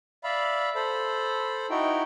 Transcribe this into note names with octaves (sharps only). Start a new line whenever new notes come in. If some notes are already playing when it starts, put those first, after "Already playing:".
D5 E5 F5 B5
A4 C5 B5
D#4 E4 F#4 G5